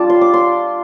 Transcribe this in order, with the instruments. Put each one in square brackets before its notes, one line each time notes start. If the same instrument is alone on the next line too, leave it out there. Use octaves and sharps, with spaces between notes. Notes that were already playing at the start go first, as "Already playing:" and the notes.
Already playing: [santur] G3 D4 F4 D5 A5
C6
D6
C6